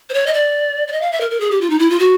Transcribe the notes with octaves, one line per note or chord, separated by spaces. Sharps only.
C5
C#5
D#5
D5
D5
D#5
F5
E5
A#4
A#4
G#4
G4
F4
D#4
E4
F4
F#4